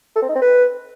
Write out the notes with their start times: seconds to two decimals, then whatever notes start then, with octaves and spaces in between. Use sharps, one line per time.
0.16 A4
0.22 C4
0.29 D#4
0.35 C4
0.42 B4